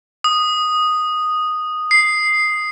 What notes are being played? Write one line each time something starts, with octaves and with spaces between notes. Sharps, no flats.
D#6
C7